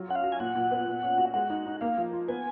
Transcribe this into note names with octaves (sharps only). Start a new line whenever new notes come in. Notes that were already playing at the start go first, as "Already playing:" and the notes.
Already playing: F#3 F4
C#4 F#5
F5
F#4
G#5
A#2 F#5
A#2
B3
A#2
C#4
F#4
G#3 F#5
D#4
D#4
A#3 F5
F3
F4
B3 G#5